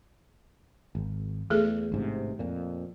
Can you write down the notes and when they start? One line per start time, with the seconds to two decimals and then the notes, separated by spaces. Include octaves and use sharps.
0.95 G#1
1.50 E2 A3 G#4 A4
1.92 A1 G#2 C3
2.39 F2 A#2